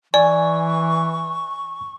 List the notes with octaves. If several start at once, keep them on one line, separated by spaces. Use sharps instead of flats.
E3 D5 G#5 C#6